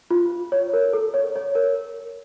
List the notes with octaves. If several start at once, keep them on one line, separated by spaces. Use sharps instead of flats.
F4
C#5
A#4
A4
C#5
C#5
A#4